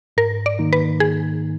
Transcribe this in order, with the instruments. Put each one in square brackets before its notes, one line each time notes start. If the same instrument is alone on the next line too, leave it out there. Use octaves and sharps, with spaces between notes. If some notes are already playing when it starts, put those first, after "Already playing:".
[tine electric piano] G#2 [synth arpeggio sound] A#4
[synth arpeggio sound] D5
[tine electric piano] D#3 A#3 D#4
[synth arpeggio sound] B4
G#4